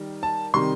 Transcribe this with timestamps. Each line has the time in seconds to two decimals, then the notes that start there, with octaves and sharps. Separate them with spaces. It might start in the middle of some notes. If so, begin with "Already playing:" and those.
Already playing: D#3 G3
0.23 A5
0.54 C3 D#3 G3 C6